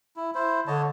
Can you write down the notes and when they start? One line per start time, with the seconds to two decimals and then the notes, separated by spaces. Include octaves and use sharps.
0.16 E4
0.35 E4 C5
0.67 D3 C#5 D#5 A5